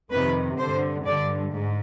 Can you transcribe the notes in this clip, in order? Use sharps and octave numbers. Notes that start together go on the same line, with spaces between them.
F2 C3 D#3 B4
G2 D3 C5
G2 D3 D5
G#2